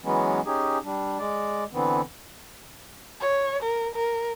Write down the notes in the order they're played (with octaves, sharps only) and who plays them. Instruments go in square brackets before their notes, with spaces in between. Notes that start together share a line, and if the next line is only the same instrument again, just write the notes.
[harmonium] E3 F#3 G#3 B3 C#4
C#4 D#4 G4 G#4
G3 D4
G#3 D5
D3 E3 B3 C4
[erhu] C#5
A#4
A#4